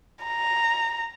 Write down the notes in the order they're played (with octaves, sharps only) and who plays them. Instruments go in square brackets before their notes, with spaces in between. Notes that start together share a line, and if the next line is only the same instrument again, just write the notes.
[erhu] A#5